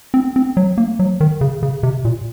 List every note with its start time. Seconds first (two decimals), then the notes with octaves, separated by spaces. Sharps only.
0.14 C4
0.36 C4
0.57 F#3
0.78 A#3
0.99 F#3
1.21 D#3
1.41 C#3
1.63 C#3
1.83 C3
2.05 A#2